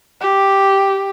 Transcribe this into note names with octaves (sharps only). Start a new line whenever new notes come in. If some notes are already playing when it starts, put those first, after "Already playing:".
G4